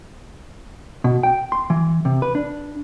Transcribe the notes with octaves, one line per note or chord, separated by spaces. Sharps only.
B2
G5
C6
E3
C3
B4
D4